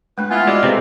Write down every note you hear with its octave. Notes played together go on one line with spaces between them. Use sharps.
G#3 A3 D4 B4
B3 E4 F4 G#5
G#3 F#4 D5
C3 C4 A4 B4 F5